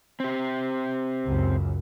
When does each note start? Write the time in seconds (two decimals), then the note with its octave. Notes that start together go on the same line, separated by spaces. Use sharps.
0.20 C4 G4
1.26 C#2 F#2